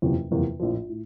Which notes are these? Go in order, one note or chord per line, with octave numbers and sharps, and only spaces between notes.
F#1 E2 C3 F3 A#3
F#1 E2 C3 F3 A#3
A#1 A2 F3
A2